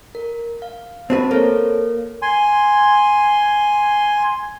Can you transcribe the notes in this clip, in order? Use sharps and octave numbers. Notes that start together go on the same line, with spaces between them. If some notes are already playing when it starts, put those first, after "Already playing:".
A#4
F5
C4 F#4 B4 C5 A5
A#3 A4 C#5
G#5 C6